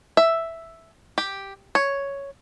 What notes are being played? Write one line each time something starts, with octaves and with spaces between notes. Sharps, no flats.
E5
G4
C#5